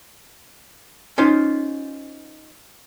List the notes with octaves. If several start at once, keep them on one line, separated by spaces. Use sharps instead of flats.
C#4 D#4 F4 C5